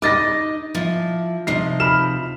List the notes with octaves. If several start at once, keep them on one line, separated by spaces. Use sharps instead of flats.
D#4 D#5 D6 A6 A#6
F3 E4
C3 F3 D#4 C7
B5 F6 E7